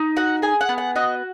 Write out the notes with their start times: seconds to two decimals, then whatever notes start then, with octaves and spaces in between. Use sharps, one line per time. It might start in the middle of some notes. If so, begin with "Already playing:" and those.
Already playing: D#4
0.17 F#4 F#5
0.42 G#4 G#5
0.61 F#5
0.69 B3
0.78 F#5
0.95 F#4 D#5